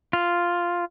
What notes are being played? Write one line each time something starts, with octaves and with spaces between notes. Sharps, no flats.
F4